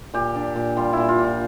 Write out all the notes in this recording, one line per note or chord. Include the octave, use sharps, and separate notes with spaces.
A#2 G4
D4
A#2
G3 F4
A#2 E4
F4
D4
F4